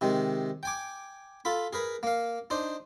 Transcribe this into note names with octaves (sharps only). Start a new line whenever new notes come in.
C3 D#3 G#3
G5 G#5 D6
F4 A4 B5
G#4 A#4 B4
A#3 F5
D4 D#4 C5